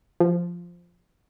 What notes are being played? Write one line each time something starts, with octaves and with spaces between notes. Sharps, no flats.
F3